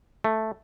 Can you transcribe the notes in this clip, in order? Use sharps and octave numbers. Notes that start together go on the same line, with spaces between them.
A3